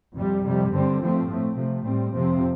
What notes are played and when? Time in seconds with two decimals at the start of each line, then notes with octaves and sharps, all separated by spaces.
0.16 F2 C3 G3
0.44 F2 C3 G3
0.72 G2 D3 G3 C4
1.00 G2 F3 A3 C4
1.29 A2 A3 C4
1.57 C3 F3 A3
1.85 A2 G3 C4
2.14 F2 C3 F3 C4